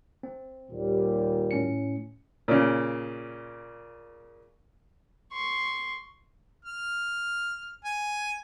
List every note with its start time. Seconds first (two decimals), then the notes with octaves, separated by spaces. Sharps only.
0.23 C4
0.71 D#2 A#2 G3
1.51 A2 C#4 C#7
2.48 A#2 C#3
5.32 C6 C#6
6.65 F6
7.85 G#5